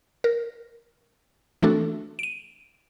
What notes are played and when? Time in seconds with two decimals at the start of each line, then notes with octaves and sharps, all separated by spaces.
0.24 A#4
1.63 E3 A3 C4 D4 F#4 A4
2.19 D7 D#7